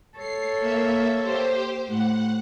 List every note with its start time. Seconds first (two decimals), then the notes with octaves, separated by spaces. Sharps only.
0.18 A4 C#5 C7
0.59 A#3 E5
1.21 G4 C5
1.89 A2 F#5